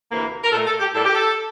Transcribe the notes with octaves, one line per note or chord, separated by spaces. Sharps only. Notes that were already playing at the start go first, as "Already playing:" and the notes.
D2 C3 E3 A#3
A#4
A#2 A3 A4
A4
G4
A2 G3 A#3 A4
G4
A4